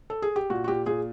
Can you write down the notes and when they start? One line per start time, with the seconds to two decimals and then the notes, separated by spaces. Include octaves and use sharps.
0.10 A4
0.22 G#4
0.36 G4
0.50 A#2 F#4
0.64 F#4
0.68 A#2 G4
0.86 A#2 G#4